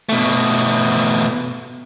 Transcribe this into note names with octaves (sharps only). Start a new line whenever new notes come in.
B2 A3